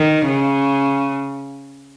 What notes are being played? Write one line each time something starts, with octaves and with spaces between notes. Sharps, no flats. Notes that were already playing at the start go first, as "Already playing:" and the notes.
Already playing: D#3
C#3